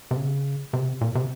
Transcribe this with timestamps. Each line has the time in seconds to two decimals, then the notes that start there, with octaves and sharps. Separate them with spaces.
0.11 C3
0.16 C#3
0.73 C3
1.01 A#2
1.15 C3